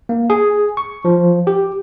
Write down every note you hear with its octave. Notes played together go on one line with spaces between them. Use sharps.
A#3
G#4
C#6
F3
G4